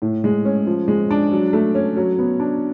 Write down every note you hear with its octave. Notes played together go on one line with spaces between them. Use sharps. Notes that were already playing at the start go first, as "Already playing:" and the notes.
A2
G#3
C#4
F3
G#3
D4
F#3
A3
C#4
F#3
B3
D4